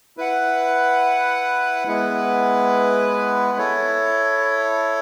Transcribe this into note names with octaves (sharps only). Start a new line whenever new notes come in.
E4 B4 F#5
G#3 B3 E4 B4
E4 A4 C#5